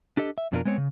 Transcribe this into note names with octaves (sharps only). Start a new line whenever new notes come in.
D4 G4 A4 D#5
E5
F2 B2 D4 E4 F4 A#4
G#3 B3 C4 C#5
C#3